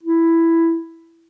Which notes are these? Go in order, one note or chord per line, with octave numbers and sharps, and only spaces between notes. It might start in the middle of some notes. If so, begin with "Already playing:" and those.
E4